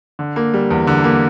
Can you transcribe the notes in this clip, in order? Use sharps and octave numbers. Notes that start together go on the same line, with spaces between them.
D3
A#3
G3
E2
D3
A#3